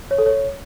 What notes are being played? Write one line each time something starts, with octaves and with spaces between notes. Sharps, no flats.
C#5
A4
C#5